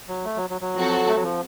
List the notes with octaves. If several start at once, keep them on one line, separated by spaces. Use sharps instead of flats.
F#3
A3
F#3
F#3
F#3
F3 C4 F#4 A4
A3
F#3
F3